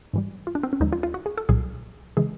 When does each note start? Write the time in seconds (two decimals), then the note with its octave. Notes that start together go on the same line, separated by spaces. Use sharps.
0.13 G#2 E3 G3
0.47 F4
0.55 D4
0.63 C4
0.73 C#4
0.80 D#2 D3 F3 G#3 D#4
0.93 F4
1.03 F4
1.14 F#4
1.26 G#4
1.38 A4
1.49 C2 A#2 F#3 G#4
2.17 C#3 E3 G#3 G#4